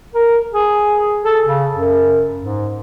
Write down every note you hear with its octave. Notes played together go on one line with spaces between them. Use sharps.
A#4
G#4
A4
C#3
F#2
G#2